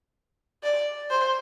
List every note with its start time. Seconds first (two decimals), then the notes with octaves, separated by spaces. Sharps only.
0.63 D5
1.10 C5